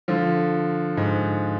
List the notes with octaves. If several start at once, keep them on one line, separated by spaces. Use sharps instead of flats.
D3 F3
G#2